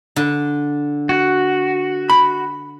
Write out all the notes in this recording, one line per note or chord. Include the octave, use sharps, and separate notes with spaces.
D3
F#4
B5